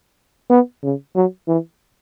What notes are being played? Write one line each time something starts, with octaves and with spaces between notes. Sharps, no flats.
B3
C#3
F#3
E3